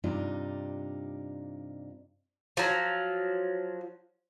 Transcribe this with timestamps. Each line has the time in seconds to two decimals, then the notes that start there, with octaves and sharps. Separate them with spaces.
0.04 G2 C3 D4 D#4 F4
2.57 F3 F#3